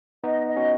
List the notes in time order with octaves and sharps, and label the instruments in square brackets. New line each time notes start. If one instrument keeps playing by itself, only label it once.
[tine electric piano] B3 D#4 [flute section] D#5
[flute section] D#5
[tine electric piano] C#4 F#4